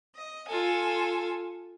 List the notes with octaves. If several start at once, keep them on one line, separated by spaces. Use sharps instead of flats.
D#5
F4 A4 G#5